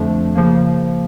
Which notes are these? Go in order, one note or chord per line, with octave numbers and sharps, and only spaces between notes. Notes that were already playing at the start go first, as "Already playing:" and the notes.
Already playing: F2 D3 F3 A3 D4
C#3 F3 A#3